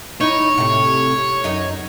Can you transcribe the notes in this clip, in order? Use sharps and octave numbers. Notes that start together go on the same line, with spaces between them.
D#4 E4 C#5
A2 C3
F#2 D#4